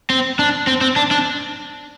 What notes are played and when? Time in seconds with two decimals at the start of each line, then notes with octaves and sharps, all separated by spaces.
0.10 C4
0.39 D4
0.67 C4
0.81 C4
0.96 D4
1.11 D4